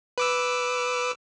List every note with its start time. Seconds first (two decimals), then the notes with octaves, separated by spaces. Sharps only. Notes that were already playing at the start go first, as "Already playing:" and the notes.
0.18 B4 D6 E6